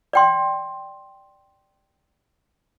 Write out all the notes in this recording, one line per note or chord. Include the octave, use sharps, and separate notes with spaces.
D5 G5 C6